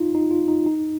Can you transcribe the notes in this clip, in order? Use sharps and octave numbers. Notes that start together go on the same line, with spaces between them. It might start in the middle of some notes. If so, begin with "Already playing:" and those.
Already playing: D#4 F4
D#4
F4
D#4
D#4